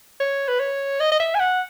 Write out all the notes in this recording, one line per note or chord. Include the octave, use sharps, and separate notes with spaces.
C#5
B4
C#5
D#5
D#5
E5
G#5
F#5